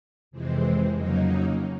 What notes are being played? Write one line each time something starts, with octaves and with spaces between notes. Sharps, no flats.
F2 C3 E3 G#3 C4
F2 C#3 F#3 A#3 D#4